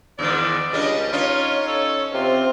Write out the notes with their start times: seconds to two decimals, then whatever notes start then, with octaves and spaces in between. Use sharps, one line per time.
0.19 E2 G#2 D#3 D5
0.73 C#2 G3 C#4 D4 D#5
1.13 C#4 D#4 F4 C#5
1.67 A4
2.14 C3 C4 F4